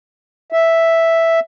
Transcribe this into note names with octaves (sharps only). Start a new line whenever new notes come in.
E5